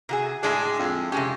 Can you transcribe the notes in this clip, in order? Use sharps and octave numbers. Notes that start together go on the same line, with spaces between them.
C3 F#4 G#4
A2 G#3 D4 G#4
F2
C3 G#3 C#4 G4